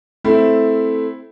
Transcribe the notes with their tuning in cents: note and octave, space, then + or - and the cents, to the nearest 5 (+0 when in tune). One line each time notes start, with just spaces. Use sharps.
A3 +0 C4 +0 E4 +0